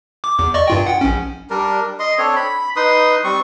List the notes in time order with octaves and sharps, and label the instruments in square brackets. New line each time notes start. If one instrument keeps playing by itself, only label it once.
[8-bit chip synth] D6
E2 D6
D5 D#5 C#6
G2 F4 G5
F#5 G5
A#1 C#4
[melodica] G3 D4 A#4
D#5 C6
C4 D4 A4 C#5
B5
D#4 B4 C6 D#6
G3 C4 C#6